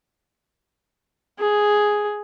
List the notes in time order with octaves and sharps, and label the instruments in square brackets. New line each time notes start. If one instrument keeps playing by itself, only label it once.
[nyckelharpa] G#4